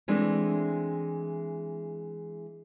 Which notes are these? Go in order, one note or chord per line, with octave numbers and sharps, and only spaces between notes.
E3 G#3 A3 C4 D4